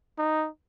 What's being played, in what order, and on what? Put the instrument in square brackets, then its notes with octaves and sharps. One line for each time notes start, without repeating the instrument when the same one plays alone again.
[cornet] D#4